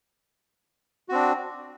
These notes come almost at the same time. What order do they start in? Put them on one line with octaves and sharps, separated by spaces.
F#4 C4 D4